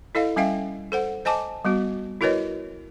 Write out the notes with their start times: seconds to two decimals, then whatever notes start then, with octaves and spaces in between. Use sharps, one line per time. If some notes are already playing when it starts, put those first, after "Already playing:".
0.15 E4 A4 D#5 F5
0.36 G3 C#4 E5 F5 G5
0.92 A4 C5 F#5
1.25 C5 D#5 G#5 A5 D6
1.65 G3 B3 F#4
2.21 E4 F#4 A#4 B4 C#5 D#5